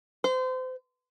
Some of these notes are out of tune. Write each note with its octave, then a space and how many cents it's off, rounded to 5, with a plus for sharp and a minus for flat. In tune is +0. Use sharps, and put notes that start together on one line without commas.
C5 -30